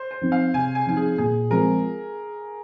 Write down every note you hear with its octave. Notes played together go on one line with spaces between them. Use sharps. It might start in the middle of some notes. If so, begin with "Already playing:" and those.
Already playing: C5
C5
F3 C4 D#4
F5
C3 G#5
G#5
F3 C4 D#4 G#5
G#4
A#2 G#4
F3 G#3 C4 A#4